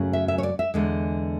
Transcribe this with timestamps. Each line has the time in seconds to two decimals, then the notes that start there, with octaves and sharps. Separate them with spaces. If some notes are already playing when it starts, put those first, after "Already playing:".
Already playing: F#2 C#3 F#3 A3
0.13 E5
0.28 E5
0.38 C#5
0.43 D5
0.59 E5
0.74 E2 D3 G#3